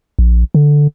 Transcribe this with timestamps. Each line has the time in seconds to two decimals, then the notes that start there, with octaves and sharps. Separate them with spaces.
0.19 A#1
0.55 D3